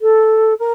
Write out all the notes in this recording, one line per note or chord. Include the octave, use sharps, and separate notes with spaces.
A4
A#4